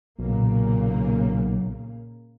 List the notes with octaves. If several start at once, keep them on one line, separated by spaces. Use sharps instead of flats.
B1 A#2 C#3 A#3